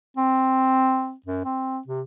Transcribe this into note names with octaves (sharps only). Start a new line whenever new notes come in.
C4
F#2
C4
C3